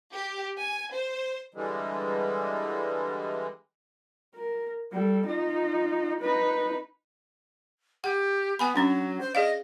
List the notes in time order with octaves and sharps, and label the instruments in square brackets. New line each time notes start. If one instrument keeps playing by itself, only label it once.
[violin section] G4
G#5
C5
[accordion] D3 E3 G3 G#3
[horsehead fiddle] A#4
G3 A4
D#4 F4
D#4 B4
[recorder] G4 [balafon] F#5
[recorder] B3 [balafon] F#5 G#5 B5
[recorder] F#3 [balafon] C#4 D4
[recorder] C5
[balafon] G#4 D5 F5 [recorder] D#5